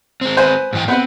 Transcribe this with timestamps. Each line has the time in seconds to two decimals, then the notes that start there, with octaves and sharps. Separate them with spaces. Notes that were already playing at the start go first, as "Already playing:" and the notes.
0.21 G#3 C4
0.37 B4 C5 G#5
0.73 G#2 E3 G5
0.88 B3 C4 B4